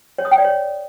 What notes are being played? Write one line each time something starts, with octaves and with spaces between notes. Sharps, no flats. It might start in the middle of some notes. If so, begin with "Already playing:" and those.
C#5
D#6
G5
D5
C#5